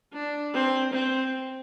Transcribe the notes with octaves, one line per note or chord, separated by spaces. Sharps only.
D4
C4
C4